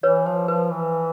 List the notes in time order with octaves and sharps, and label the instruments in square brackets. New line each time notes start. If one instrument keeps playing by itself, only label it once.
[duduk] E3 [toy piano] B4 C#5
[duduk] F3 [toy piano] C5
[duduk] F3 [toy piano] B4
[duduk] E3